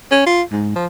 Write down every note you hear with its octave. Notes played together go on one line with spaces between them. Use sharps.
C#4
F4
G#2
F3